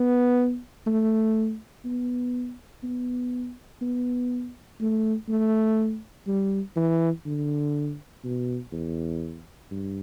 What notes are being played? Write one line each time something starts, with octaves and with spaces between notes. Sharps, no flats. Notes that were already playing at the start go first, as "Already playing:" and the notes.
Already playing: B3
A3
B3
B3
B3
A3
A3
G3
E3
D3
B2
E2
G2